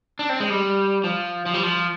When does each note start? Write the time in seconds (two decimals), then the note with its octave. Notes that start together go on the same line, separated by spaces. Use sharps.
0.19 D4
0.29 C4
0.40 G#3
0.50 G3
1.04 F3
1.46 F3
1.54 G3
1.63 F3